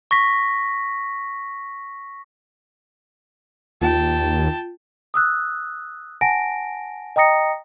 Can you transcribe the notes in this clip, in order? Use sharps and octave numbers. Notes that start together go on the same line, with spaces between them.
C#6 A#6 B6
D#2 F4 G5 A5
D#6 E6 F#6
F#5 G#5 A5 A#6 D7
D#5 G5 A#5 D#6 A#6 C#7